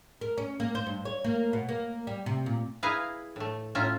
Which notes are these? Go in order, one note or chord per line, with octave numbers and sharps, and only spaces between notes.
A#4
C#4
A#3
C5
G2
C#5
A#3
B2
A#3
G3
C3
A#2
E4 G#4 B4 F5 A#5
A2 A3
A2 C#4 F4 E5 A#5